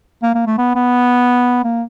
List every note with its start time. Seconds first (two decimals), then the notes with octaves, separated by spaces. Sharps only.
0.23 A#3
0.35 A#3
0.47 A3
0.58 B3
0.76 B3
1.64 A#3